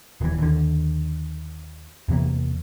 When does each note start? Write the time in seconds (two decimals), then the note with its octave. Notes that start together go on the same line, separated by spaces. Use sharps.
0.21 D#1 E3
0.38 D#2 D3
2.09 E2 C3 E3 A#3